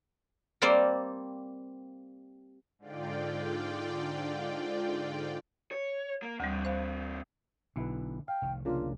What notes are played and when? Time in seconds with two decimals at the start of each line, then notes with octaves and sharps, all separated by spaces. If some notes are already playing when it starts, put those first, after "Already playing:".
0.62 G3 A#3 C4 C5 D5 F5
2.79 G#2 D3 F4 D5 G5
5.71 C#5
6.23 A#3
6.40 D2 E3 G3 C4
6.65 C5 F5
7.76 B1 D3 E4 B4
8.28 F5 G5
8.42 F1 C2 D#3
8.65 C#3 A#3 D4 F4